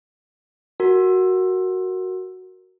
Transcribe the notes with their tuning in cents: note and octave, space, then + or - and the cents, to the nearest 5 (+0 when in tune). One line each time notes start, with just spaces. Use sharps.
F#4 +0 A#4 -5